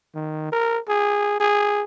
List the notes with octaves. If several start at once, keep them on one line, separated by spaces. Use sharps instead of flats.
D#3
A#4
G#4
G#4